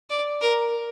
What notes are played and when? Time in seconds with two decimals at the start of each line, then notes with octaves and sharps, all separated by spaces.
0.10 D5
0.41 A#4